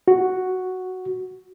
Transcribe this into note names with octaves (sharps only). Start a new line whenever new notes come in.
F#4